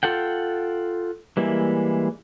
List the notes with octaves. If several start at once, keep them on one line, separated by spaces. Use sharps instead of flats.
F4 A4 F#5 G5
E3 G3 G#3 A#3 E4